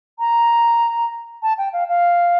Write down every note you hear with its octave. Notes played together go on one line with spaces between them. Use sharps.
A#5
A5
G5
F5
F5